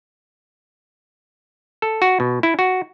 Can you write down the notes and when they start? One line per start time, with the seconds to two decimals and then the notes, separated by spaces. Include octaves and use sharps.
1.82 A4
2.02 F#4
2.20 B2
2.43 E4
2.59 F#4